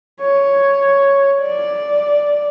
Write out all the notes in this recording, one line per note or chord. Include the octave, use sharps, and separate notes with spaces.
C#5
D5